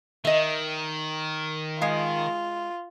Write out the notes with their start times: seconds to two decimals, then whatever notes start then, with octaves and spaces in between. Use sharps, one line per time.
0.25 D#3 D#5 E5
1.82 G#3 F4 F5